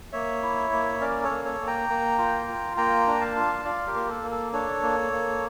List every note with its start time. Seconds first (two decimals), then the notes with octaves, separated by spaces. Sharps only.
0.13 A#3 C#5 E5
0.42 E4
0.72 A#3
1.01 C#4 A#4 D5
1.24 A4 C#5
1.31 A#3
1.45 A4 C#5
1.60 A#3
1.67 G5 A#5
1.89 A#3
2.18 F4
2.48 F4
2.76 A#3 G5 A#5
3.07 D4
3.20 F5 A5
3.36 F4
3.65 F4 D5 F5
3.86 G4 A#4
3.95 A#3
4.09 A4
4.23 A#3
4.31 A4
4.53 D4 A4 C#5
4.83 A#3
5.12 A#3